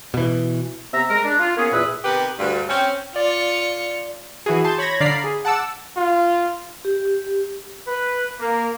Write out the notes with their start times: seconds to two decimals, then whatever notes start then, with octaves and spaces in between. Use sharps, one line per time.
0.14 B2 E3
0.93 C3 B3 E5 A#5
1.09 G#3 A#4
1.25 D4
1.40 F4
1.57 A#3 B3 C#4 G#4
1.72 E2 A#2 B4 E5 D#6
2.04 C3 D#3 B3 G4 B4
2.38 D2 G2
2.69 C4 C#4
3.16 F4 D5 C#7
4.46 E3 E4 F#4 G#4
4.65 A5 C6 G6
4.78 C#5 B5 G#6 A#6
5.00 D3 D5 F5 A#5 B5 C7
5.24 G#4
5.45 F#5 A5 D6 E6
5.97 F4
6.85 G4
7.87 B4
8.40 A#3